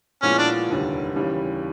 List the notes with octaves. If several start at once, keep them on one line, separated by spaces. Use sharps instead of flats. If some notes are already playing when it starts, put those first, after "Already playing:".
A#2 F3 G#3 B3 C#4 E4
D4
F1 D#2 D3 G3
D#2 C#3 E3 G3